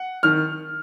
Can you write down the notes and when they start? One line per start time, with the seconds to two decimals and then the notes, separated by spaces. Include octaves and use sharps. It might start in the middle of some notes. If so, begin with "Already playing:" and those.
Already playing: F#5
0.23 D#3 F6